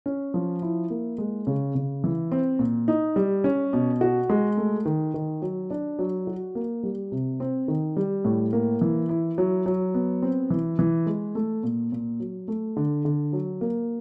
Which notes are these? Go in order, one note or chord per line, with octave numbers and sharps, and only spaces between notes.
C#4
F3
E4
A#3
G#3
C#3
C#3
E3
C4
A#2
D#4
G3
C#4
B2
F#4
G#3
A3
D#3
D#3
F#3
D4
F#3
F#4
A#3
G3
C3
C4
D#3
G3
A2
A#3
E3
E4
F#3
F#3
B3
C4
E3
E3
G#3
A3
A#2
A#2
F#3
A3
D3
D3
F#3
A#3